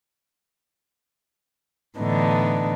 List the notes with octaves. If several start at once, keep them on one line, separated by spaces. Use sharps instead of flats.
A2 D3 E3 B3 D4 D#4